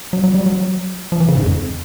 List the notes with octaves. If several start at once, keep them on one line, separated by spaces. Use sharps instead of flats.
F#3
F#3
G3
F#3
F3
E3
C#3
G#2
F2